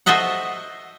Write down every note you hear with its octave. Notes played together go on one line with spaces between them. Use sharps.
F#4 A4 C5 D#5 E5 F#5